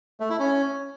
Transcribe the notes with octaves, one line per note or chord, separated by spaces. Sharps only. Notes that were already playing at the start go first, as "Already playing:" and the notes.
A3
E4
C#4